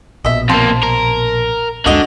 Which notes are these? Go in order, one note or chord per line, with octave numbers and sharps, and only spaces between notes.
A#1 B2 D#5 E5
F2 A#3 C5 A5
A#4
C2 F2 D3 G#3 F#4 D#5